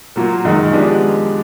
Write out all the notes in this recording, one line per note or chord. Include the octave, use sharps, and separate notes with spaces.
A#2 F#3 A#3
F#2 D#3 G#3
F3 G#3 B3 D4 G4